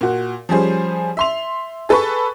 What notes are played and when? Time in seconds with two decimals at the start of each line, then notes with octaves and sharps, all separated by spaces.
0.01 A#2 F#4
0.49 F3 G3 C#4 G#4 C5
1.17 E5 C6 F7
1.89 G#4 A4 B4 B5 C#6